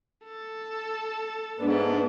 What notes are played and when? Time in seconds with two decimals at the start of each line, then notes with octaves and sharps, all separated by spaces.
0.23 A4
1.60 G#2 A3 B3 D4